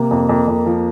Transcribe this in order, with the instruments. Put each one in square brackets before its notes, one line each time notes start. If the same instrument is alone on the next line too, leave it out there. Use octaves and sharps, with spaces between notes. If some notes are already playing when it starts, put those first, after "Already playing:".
Already playing: [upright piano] C3 [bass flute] A#3
[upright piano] F2
F2
F2
F3